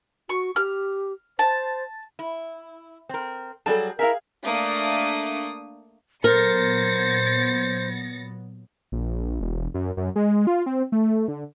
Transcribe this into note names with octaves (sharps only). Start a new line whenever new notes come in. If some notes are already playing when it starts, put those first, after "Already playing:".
F#4 C#6
G4 F6
C5 A5
E4
C4 A#4
F#3 G3 G#4 A4 D5 A5
E4 G#4 A#4 E5 F5
A3 A#3 D4 D#6
A#2 F#3 B3 A#4 C5 A6 A#6 C#7
A#1
E1
F#2
F#2
G#3
F4
C4
A3
D3